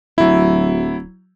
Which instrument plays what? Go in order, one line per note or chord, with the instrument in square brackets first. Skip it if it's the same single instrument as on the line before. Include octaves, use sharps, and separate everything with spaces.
[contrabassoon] D1 [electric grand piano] F#3 E4